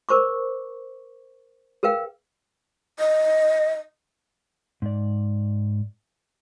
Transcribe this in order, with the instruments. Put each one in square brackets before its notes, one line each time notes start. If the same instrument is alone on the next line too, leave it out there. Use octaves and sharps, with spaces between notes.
[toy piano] A#4 C5 C#6 D6
G#4 A#4 B4 F5 G5
[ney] D#5
[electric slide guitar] G#2 D5